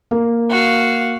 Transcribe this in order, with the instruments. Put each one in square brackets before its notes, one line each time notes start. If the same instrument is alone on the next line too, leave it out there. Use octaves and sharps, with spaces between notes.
[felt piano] A#3
[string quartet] F#4 F5